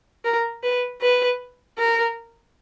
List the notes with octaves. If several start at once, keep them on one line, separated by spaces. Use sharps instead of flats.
A#4
B4
B4
A#4